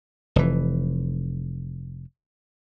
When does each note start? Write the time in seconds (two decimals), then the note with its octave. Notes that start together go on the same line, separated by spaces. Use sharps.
0.36 F1 E3